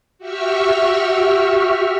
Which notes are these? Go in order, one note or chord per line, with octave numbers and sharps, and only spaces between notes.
F#4 G4 E5 C#6 E6 F6